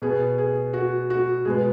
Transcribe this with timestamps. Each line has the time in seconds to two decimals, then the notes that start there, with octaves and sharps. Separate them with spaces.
0.02 B2 B3 G#4
0.38 G#4
0.73 F#4
1.10 F#4
1.45 B2 G#3 B3 G#4